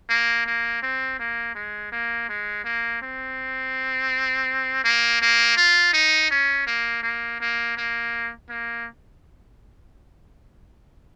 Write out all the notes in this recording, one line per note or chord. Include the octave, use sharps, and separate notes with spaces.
A#3
A#3
C4
A#3
G#3
A#3
G#3
A#3
C4
A#3
A#3
F4
D#4
C#4
A#3
A#3
A#3
A#3
A#3